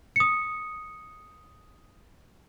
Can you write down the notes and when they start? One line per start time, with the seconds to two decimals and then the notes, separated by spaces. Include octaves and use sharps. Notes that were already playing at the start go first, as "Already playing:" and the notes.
0.16 D#6 C#7